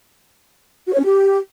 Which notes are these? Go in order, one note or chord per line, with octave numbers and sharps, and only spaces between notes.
F#4
C#5
C#4
G4